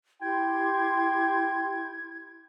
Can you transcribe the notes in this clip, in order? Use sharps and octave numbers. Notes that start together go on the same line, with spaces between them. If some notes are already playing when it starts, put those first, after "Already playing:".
E4 G4 G5 C6 G#6